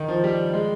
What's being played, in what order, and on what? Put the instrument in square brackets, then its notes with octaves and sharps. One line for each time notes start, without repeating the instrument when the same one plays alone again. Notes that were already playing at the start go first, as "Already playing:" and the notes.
Already playing: [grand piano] D#3
F3
G3
G#3